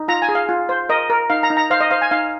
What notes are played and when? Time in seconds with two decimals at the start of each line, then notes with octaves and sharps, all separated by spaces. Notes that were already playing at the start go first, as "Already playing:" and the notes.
Already playing: D#4
0.08 F4 A#5
0.22 G#5
0.29 G#4
0.35 F5
0.49 F4
0.69 C5
0.89 A#4 D#5
1.10 A#4
1.30 D#4 F5
1.43 A#5
1.50 D#4
1.57 A#5
1.70 C5 F5
1.81 D#5
1.91 C5 F5
2.02 G#5
2.11 D#4 F5